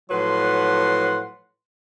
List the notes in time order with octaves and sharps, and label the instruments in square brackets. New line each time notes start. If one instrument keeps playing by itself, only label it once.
[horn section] A2 F3 F#3 B4 F#5 C6